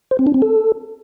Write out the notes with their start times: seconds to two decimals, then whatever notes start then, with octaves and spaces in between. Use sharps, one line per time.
0.11 C5
0.19 C4
0.27 D4
0.34 C4
0.42 A4